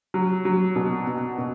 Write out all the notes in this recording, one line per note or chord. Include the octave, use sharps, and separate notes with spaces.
F#3
F#3
B2
B2
B2